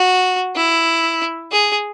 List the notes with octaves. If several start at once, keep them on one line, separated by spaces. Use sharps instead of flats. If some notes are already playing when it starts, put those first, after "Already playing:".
Already playing: F#4
E4
G#4